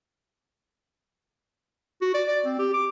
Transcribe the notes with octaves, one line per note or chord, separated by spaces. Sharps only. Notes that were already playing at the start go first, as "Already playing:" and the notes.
F#4
D5
D5
C4
G4
D6